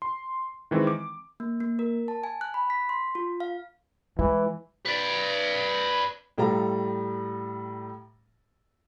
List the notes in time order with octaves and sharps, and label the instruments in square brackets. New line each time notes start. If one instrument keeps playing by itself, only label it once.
[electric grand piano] C6
D#3 E3 G#3 C4
D6
[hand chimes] A#3
A#3
A#4
A5
G#5
F#6
B5
B6
C6
F4
F5
[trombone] E3 [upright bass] G#3 [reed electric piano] E4
[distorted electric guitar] B4 D5
[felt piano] A2 G3 A4 F5 A#5